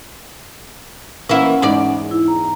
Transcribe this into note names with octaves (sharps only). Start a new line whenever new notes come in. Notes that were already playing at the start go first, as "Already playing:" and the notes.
E3 A#3 C#4 E4 F#5
E2 G#2 D5
E4
A#5